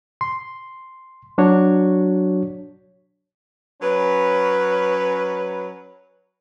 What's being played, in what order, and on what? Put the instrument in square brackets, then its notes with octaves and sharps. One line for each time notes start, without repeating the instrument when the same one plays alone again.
[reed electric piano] C6
F#3 D4 F#4 C#5
[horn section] F#3 C#4 B4